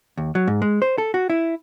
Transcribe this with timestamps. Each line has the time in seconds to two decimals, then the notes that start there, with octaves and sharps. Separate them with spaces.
0.17 D#2
0.35 F#3
0.47 G#2
0.62 G#3
0.82 C5
0.98 A4
1.14 F#4
1.30 E4